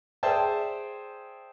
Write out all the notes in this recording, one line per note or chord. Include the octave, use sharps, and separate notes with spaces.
G#4 C5 D5 E5 G5 A5